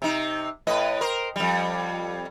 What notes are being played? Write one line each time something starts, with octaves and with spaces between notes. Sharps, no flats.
C3 D#4
A2 B4 D#5
A#4 C5
F2 G3